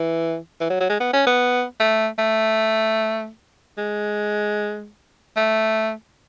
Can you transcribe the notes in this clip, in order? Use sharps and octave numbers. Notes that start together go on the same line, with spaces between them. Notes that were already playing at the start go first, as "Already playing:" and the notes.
Already playing: E3
E3
F#3
F#3
G#3
B3
C#4
B3
A3
A3
G#3
A3